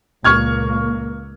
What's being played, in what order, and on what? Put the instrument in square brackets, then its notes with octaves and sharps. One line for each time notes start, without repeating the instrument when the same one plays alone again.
[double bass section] C#2 A#2 A#3 [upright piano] C#6 F6 G#6